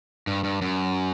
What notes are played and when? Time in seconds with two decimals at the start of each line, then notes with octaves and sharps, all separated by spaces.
0.27 G2
0.44 G2
0.62 F#2